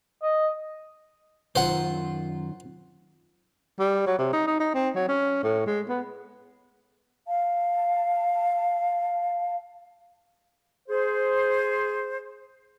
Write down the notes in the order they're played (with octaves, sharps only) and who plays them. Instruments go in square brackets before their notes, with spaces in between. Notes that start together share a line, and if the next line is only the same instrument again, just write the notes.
[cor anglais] D#5
[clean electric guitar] F#2 D#3 F4 [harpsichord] C5 F#5
[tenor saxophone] G3
F#3
C3
D#4
D#4
D#4
C4
F#3
C#4
A2
G#3
B3
[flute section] F5 A5
[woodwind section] G#4 C5